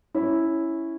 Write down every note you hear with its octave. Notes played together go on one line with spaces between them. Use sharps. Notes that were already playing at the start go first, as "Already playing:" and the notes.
C#4 E4